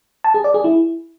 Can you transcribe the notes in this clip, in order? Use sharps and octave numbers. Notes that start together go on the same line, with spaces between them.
A5
G#4
D5
G#4
E4